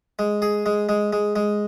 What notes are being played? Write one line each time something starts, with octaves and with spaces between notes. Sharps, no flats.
G#3
G#4
G#3
G#3
G#3
G#3